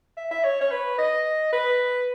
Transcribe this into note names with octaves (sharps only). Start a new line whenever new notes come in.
E5
E5
C#5
C#5
B4
D#5
B4